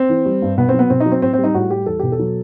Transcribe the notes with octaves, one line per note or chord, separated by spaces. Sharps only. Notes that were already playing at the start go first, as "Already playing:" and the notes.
Already playing: C4
E3
G3
G2
B2 B3
C4
F#3
B3
B2 C4
D#4
F#3
C4
A2 C4
C4
G3
D#4
A2 F#4
G3 G4
E2 A4
B2 G4
A4
F#3